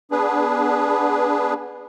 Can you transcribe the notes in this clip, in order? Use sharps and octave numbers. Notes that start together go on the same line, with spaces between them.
B3 D4 G#4 B4